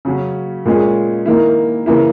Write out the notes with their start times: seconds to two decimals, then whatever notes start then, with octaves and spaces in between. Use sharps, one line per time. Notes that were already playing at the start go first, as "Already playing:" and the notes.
0.05 C#3 F#3 C#4
0.65 A#2 G#3 C#4 G#4
1.26 D#3 A#3 E4
1.86 C#3 E3 A#3 E4